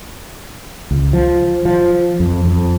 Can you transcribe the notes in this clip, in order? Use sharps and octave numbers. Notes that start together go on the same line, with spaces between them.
C#2
F3
F3
F2
F2